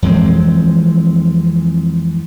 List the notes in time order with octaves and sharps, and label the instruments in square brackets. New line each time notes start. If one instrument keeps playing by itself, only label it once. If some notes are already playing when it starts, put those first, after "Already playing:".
[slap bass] F2 E3 G#3 C4